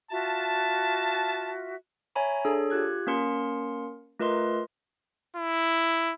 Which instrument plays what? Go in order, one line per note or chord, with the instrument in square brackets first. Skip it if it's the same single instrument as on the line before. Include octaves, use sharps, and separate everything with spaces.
[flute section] F4 F#4 E5 [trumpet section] A5
[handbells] C#5 E5 G#5 A#5 B5
D4 G#4 A4 C#5
F4 G4 F#6 G#6
A#3 C#4 A#4 C6 C#7
A3 F4 A#4 B4 D#5 C6
[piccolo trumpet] E4